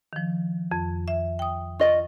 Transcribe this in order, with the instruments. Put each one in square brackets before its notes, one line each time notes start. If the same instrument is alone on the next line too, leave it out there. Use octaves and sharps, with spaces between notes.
[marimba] D#3 F3
F2
E5
G5 D#6
[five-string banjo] F4 D#5 [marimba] C#6 A6